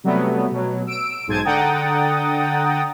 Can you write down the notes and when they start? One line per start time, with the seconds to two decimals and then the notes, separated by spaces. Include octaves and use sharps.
0.04 C3 F#3 G3 A3 B3
0.52 B2 F#3
0.87 E6 D7
1.27 B1 G#2 C5 A5 G#6 D#7
1.44 D3 F#5 G5 A#5 D#6 A6